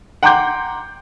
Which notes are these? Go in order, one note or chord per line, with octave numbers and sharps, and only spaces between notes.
F#5 G5 A#5 C6 D6 G6